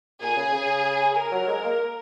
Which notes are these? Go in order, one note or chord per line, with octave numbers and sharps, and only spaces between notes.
A#2 G#4
C#3
C#3
A#4
F#3
G#3
A#3